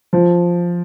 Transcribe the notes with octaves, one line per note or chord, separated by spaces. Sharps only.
F3